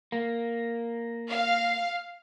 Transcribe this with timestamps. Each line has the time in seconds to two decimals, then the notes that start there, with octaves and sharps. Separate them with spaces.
0.12 A#3
1.29 F5